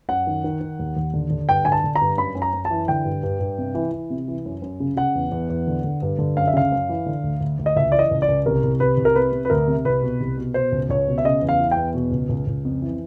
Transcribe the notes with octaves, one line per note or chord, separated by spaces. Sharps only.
F#2 F#5
D#3
D#3
D#3
D#2
D#2
D3
D3
G2 G5
D3 G#5
A5
D3
A#5
G2
F#2 B5
F#2
A#5
F#2
A5
E3
D3 G5
G2
G2
G2
C3
E3
E3
C3
E3
F#2
F#2
C#3
C#3 F#5
E2
E2
E2
D3
D3
G2
D3
F#2 F5
E5
C#3 F5
F#2
E3
D3
D2
D2
D2
D#5
C#2 E5
E3 D5
D#5
C#2
D5
C#2
C2 A#4
C2
C2 B4
C2
A#4
C3 B4
C3
B4
D2 A#4
C3
C2 B4
B2
C2
B2
B2 C5
C#2
C#2 C#5
B2
E5
C#3 D#5
E2
F5
E3
G5
E2
B2
C#2
C#2
C#2
F2
E3